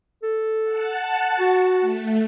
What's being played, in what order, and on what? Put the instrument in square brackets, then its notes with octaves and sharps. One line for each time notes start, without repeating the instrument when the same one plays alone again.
[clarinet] A4
[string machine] F#5 A5
[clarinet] F#4
[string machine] A3